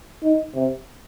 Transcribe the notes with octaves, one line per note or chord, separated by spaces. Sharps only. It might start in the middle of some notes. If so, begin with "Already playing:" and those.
D#4
C3